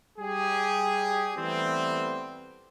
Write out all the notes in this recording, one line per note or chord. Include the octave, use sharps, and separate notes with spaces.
G3 G4 G#4
E3 G3 A3 B3 C4